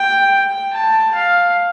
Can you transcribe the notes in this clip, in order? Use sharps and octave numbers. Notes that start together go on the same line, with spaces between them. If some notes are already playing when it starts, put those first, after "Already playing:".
Already playing: G5
G5
A5
F5